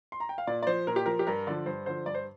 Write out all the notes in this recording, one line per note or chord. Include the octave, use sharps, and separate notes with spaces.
C6
A#5
G5
F5
A#2 D5
D5
F3 C5
A#2 A#4
G4
F3 A#4
G4
G2 A#4
D3 F3 D5
G2 C5
D3 F3 C5
G2 D5
C5